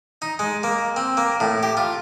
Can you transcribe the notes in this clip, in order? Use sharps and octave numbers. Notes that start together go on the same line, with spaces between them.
D#4
G#3
A#3
C4
A#3
A2
G4
F4